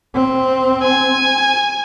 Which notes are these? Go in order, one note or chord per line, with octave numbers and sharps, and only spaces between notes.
C4
G#5